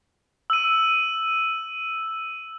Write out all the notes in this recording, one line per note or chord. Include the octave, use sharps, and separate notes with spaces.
E6 D#7